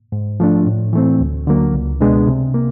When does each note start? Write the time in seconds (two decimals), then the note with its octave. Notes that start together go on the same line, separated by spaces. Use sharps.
0.12 G#2
0.40 F3 A3 D4
0.66 A2
0.93 E3 A3 C4
1.21 D2
1.47 D3 F#3 A#3
1.74 C#2
2.01 B2 G#3 B3 D4
2.27 C3
2.54 A#3